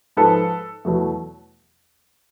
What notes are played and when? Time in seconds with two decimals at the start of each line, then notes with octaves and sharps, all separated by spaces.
0.17 G#2 F3 G#3 A4 B4
0.85 E2 B2 F#3 A3